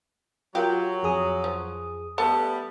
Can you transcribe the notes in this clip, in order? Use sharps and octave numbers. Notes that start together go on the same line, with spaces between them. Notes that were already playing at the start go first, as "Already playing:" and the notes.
F#3 F4 G4 A#4 G5
F2 G#4 D#6
F3
G3 A3 B3 A4 A5